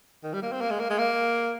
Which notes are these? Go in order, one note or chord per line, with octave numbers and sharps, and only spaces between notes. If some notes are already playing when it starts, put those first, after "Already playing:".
D#3
G3
A#3
C4
A#3
G#3
A#3
G#3
A#3